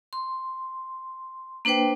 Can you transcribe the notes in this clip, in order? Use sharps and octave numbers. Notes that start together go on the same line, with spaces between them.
C6
A#3 D4 B4 C5 G5